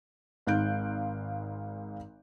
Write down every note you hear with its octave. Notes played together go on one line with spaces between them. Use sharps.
G#1 G#2 F5 F#6 G6 D7